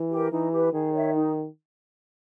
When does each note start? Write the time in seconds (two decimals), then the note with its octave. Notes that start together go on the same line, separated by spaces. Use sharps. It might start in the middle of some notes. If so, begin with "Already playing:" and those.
Already playing: E3
0.11 G4 A#4
0.32 E3 D#4
0.52 G4 B4
0.73 D#3 G#4
0.93 C#5 E5
1.14 D#4